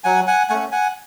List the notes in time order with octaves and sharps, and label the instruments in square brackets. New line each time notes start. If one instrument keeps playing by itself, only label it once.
[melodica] F#3 F#5 G#5
F#5 G#5
A3 C#4 F#5 G#5
F#5 G#5